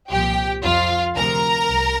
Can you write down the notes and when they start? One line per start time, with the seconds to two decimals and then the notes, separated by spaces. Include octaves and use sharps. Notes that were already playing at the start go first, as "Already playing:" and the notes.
0.11 C2 A#2 F3 G4 G5
0.63 F2 F3 F4 F5
1.16 D2 C3 F3 A#4 A#5
1.70 C2